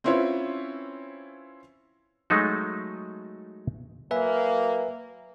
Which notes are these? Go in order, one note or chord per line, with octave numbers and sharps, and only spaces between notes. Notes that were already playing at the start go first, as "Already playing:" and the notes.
C4 C#4 E4 F4 B4 C#5
F#3 G#3 A3 D#4 F#4
F#3 A#3 B4 E5 G#5